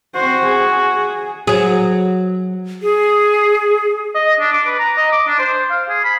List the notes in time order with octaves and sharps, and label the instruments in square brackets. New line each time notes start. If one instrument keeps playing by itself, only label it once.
[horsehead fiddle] C4 C5 [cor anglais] F#4
[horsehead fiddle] G#4
G#4
[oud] F#3 G#4
[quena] G#4
[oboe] D#5
D4
D6
B4
A#5
D#5
D6
D4
C5
F5
G#4
B5